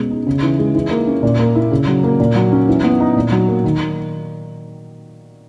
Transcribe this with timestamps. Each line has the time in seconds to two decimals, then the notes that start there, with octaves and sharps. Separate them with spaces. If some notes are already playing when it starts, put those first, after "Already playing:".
Already playing: B2 G#3 C#4
0.11 D#4
0.27 C#3
0.42 E3
0.59 G#3
0.75 E3
0.91 A#3
1.07 C#4
1.23 A#2
1.39 A#3
1.55 E4
1.71 C#3
1.87 F#3
2.03 A#3
2.19 A#2
2.36 F#3
2.52 C#4
2.68 E3
2.84 B3
3.00 D#4
3.16 A#2
3.32 F#3
3.48 A#3
3.64 D#3